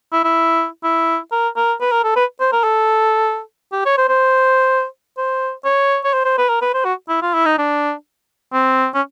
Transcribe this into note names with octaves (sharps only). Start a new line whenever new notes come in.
E4
E4
E4
A#4
A#4
B4
A#4
A4
B4
C5
A#4
A4
G4
C#5
C5
C5
C5
C#5
C#5
C5
C5
B4
A#4
B4
C5
F#4
E4
F4
E4
D#4
D4
C4
C#4